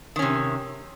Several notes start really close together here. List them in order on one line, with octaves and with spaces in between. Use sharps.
D#3 C#4 C3